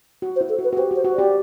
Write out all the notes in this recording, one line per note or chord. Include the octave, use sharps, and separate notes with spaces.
F#4
C5
E4
A4
F#4
B4
F#4
G4 C5
F#4
C5
F#4
G4 D5